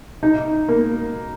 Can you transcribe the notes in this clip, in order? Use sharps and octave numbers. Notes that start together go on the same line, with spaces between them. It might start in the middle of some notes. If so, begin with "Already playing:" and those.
D#4
A#3